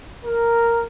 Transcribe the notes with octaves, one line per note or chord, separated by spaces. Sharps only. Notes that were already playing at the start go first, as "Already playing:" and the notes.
A#4